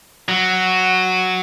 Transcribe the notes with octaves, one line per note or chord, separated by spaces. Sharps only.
F#3